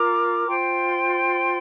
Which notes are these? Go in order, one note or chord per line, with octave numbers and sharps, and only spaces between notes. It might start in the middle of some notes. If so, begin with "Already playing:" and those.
Already playing: F4 A#4 A#5 D6
F4 C5 G5 C6